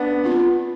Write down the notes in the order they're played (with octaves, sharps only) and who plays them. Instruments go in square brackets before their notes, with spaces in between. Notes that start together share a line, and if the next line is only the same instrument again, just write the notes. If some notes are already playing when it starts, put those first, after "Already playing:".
Already playing: [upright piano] B3 D4
[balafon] C4 F4